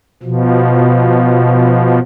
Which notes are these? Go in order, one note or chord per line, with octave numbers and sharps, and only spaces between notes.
B2 F3